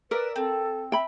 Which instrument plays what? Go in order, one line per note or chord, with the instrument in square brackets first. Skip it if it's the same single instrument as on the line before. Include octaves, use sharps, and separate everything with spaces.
[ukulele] A#4 [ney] B4 [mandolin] D5 E5 A#5
[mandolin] C4 [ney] A4
[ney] E5 [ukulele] G5 B5